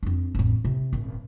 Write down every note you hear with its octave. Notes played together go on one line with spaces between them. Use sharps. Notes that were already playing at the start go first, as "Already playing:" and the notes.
F2 D4
A1 F2
C3
D#1 G#1